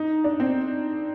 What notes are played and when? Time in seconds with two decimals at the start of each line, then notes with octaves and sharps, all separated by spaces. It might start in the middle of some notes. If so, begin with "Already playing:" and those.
Already playing: D#4
0.24 D4
0.40 C4